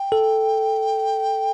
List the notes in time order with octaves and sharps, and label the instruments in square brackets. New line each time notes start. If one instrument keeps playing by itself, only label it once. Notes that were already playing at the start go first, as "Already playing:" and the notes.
Already playing: [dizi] G5
[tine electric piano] A4